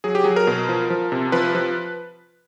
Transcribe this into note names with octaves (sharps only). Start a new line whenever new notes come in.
F#3 G#4
G4
F#3 G#4
A#4
B2
F3
F3
C3
F3 B4
F3